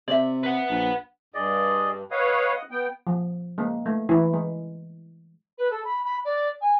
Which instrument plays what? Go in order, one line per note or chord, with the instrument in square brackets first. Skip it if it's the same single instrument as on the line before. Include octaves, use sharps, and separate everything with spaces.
[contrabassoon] C3 [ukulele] D5 E5
[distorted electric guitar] B4 F#5
[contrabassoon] A#1
[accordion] G2 [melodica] G#4 D5 D#5
[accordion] B4 C#5 F5 [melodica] D#5 F#5 D#6
[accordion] B3 G5
[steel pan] F3
G#3 A#3
A3
E3 E4
G#3
[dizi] B4
A4
B5
B5
D5
G#5